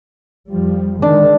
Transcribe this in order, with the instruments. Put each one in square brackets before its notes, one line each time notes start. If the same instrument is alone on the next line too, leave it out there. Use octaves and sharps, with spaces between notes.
[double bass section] F2 F3 G3
[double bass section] D3 D#3 G#3 [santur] D4